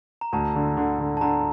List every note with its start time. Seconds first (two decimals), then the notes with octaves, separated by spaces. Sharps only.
0.21 A#5
0.32 D2 A5
0.55 D3
0.77 D3
1.00 D3
1.17 A5
1.21 D3 A#5